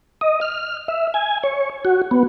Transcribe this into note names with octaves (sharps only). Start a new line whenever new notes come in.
D#5
F6
E5
G#5
C#5
F#4
B3